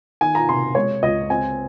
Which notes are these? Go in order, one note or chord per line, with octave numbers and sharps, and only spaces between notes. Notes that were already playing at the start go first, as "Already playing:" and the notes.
D#3 G#5
A#5
C3 C6
G#3 C#5
C#2 D#5
C4 G#5